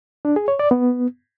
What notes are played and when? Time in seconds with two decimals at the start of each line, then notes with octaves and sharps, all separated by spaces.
0.25 D4
0.36 G#4
0.48 C#5
0.59 D5
0.71 B3